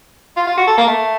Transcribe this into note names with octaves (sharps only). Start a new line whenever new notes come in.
F4
F4
F#4
A4
A#3
A3